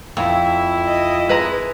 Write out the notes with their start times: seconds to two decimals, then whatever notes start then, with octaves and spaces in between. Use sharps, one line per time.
0.17 F2 E4
0.88 D#5
1.29 G#3 B4 D#5 A#5